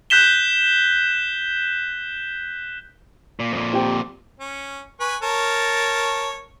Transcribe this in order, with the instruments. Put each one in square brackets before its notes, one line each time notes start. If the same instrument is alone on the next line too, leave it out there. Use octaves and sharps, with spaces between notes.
[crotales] F#6 G6 B6 E7 G7
[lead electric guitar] A#2
F2 A#2
[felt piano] C4 G4 G5
[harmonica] C#4
B4 G#5 C#6
A#4 C#5 A5